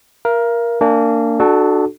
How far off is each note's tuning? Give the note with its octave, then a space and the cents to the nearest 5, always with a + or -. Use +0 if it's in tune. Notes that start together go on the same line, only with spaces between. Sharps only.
A#4 +15 F5 -40
A#3 -25 D4 +0 G#5 -15
D4 +30 F#4 +0 A4 -20